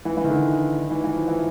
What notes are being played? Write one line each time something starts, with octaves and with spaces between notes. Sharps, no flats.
E3
E3
D#3
D3
D#3
E3
E3
F3
E3